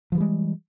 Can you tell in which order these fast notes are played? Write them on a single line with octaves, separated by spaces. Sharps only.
F3 E3 G3 G#3